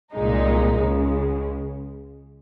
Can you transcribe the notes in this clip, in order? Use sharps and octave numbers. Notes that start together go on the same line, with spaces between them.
C2 A#2 G#3 D#4
C#2 C#3 G#3